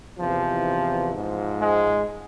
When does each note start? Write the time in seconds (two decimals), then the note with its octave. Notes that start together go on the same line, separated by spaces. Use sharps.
0.19 E2 C3 E3 F3
1.14 G#2 F3
1.61 G#3